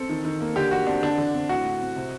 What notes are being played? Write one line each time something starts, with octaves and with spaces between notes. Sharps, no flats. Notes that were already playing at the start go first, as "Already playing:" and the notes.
Already playing: C4 A4
D#3
D#3
A#3
D3 G4
D3 F#4
C4 D4
D3 D4
D3
C4
A2 F#4
A2
C4
C3